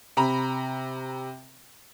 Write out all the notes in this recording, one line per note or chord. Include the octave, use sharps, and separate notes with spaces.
C3 A#5 B5